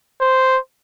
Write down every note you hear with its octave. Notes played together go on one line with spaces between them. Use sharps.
C5